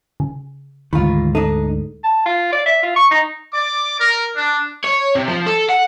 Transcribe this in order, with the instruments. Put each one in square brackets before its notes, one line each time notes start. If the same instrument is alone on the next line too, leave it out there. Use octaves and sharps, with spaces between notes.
[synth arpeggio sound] C#3
[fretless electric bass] D2 G#2 [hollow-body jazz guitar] D#3 F4 [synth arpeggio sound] B5
[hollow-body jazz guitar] D4 D#4 [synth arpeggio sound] A4
[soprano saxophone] A5
F4
D5
E5
F4
C#6
D#4
[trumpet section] D5 D6
A#4
D4
[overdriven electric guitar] C#5
C3
F3
A4
F#5